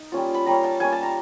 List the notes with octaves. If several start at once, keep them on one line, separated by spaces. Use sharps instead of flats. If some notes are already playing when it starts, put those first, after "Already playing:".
Already playing: D#4
G3 A#3 C#4 F4
B5
G3 A#3 C#4 A#5
A5
G3 A#3 C#4 G#5
A5
A#5